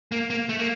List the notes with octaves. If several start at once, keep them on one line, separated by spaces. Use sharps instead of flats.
A#3
A#3
A3
A#3